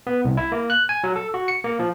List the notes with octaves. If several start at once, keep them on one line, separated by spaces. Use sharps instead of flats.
B3
C2
E4
A#3
F#6
G#5
F#3
A4
F#4
C#7
A#3
F3